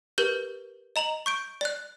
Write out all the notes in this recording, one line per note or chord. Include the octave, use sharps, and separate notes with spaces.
G4 A#4 B4 G6
D#5 A#5 F7 F#7
C#6 G6 D7
D5 F#6